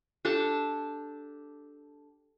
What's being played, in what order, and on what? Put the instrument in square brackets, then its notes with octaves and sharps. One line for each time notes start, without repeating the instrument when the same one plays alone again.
[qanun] D4 G4 A4 A5